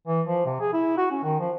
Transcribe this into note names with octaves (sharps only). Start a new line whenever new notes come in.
E3
F3
C3
G#4
E4
F#4
C#4
D#3
F3